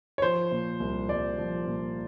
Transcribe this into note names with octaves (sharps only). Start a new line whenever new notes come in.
C#5
F3 C5
A#2
C2
C2 D5
F3
A#2